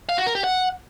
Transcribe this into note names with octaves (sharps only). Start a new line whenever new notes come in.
F5
F#4
A#4
G4
F#5